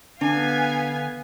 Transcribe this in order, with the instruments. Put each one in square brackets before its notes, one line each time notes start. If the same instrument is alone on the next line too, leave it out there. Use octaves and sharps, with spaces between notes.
[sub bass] D3 [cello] B3 F5 [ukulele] D4 [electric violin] G#5